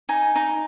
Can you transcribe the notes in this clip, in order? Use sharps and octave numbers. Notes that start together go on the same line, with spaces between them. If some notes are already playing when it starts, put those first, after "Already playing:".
D#4 G#5
D#4